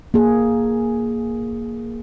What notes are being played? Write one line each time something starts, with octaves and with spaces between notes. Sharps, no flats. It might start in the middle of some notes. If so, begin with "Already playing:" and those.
A#3 G#4